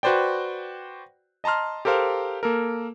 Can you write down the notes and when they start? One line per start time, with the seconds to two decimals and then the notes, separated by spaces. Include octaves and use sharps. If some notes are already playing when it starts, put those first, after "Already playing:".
0.03 F#4 B4 C5 D5 G5
1.44 D#5 A5 A#5 C6 F6
1.85 G4 A4 A#4 C5 F5
2.43 A#3 A4 A#4